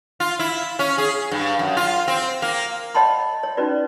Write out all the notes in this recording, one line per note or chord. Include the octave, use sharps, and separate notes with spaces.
F4
E4
C#4
G#4
G2
F#2
F4
C4
A#3
C#5 D#5 F#5 A5 B5 C6
C#5
C#4 D#4 F#4 B4 D5